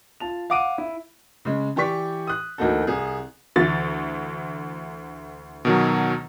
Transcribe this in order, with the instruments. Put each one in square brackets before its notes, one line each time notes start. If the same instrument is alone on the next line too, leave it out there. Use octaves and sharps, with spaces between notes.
[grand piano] F4 A5 F7
F5 F#5 D6 D7 D#7
E4
[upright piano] C#3 G#3
E3 G4 D5 C#6 B6
D#6 F#6
D2 E3 A#3 D#4 F#4 A4
C2 G#4
[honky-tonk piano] D2 E3 A6
[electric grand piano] B2 D#3 F#3